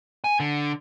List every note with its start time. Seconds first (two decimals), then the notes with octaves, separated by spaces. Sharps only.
0.24 G#5
0.40 D3